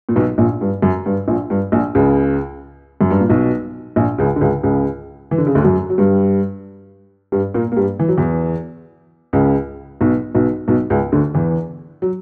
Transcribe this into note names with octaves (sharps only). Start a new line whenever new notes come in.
A#2
B1 B2
A#1 A#2
G2
F#2
G2
A#1 A#2
G2
A#1 A#2
C#2 C#3
F#2
G2
A#2
B1 B2
A#1 A#2
C#2 C#3
D3
C#2 C#3
C#2 C#3
E3
D3
C#3
D2 D3
F#2 F#3
F#3
G2 G3
G2 G3
A#2 A#3
A#3
G2 G3
E3
F#3
E2 E3
C#2 C#3
B1 B2
B1 B2
B1 B2
C#2 C#3
D2 D3
E2 E3
F#3